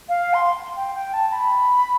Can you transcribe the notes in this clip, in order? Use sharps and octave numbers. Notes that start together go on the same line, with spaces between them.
F5
C6
G5
G5
A5
B5